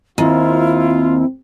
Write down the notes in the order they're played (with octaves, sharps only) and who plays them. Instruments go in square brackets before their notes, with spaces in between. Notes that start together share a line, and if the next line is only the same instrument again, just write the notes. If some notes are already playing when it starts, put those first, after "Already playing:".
[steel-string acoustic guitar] D#2 [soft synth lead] C4 [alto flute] E4 [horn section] F4